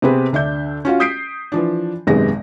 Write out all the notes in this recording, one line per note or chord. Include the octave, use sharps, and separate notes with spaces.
C3 B3 C4 G#4 B4
D2 D4 E5 G6
C#4 F4 F#4 F5
D#6 G6 B6 C7 D7
E3 F3 D4
G#1 F#2 C3 G#3 B3 A#6